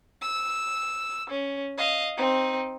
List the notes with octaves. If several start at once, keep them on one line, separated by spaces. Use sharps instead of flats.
E6
C#4
D#5 F5
C4 D#4